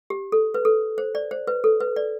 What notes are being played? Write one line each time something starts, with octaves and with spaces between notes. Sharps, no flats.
G4
A4
B4
A4
C5
D5
C5
B4
A4
B4
D5